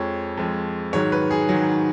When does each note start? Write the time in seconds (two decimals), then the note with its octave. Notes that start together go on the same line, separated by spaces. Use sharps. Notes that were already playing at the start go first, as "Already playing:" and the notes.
Already playing: F2 F3 G#3 C#5
0.37 F2 F3 G#3
0.93 G#2 D#3 F#3 C#5
1.12 B4
1.31 G#4
1.49 G#2 D#3 F#3